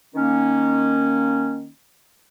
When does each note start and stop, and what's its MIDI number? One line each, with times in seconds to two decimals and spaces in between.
0.15 1.67 51
0.15 1.67 58
0.15 1.67 61